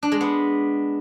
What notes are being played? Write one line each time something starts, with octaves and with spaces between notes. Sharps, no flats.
D4
G#3
B3